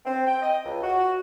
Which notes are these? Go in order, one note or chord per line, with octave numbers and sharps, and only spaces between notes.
C4
G5
D#5
C#2
F#4